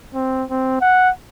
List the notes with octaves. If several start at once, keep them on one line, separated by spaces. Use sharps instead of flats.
C4
C4
F#5